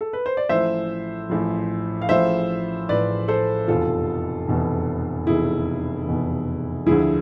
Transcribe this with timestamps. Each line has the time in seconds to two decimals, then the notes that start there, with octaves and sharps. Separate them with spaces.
0.01 A4
0.13 B4
0.26 C5
0.37 D5
0.49 A1 A2 F3 C5 E5
1.30 A1 A2 F3
2.02 F5
2.09 A1 A2 F3 C5 E5
2.89 A1 A2 F3 B4 D5
3.28 A4 C5
3.68 F1 E2 B2 F4 A4
4.48 F1 E2 B2
5.27 F1 E2 B2 E4 G#4
6.07 F1 E2 B2
6.86 D2 D3 F3 E4 G#4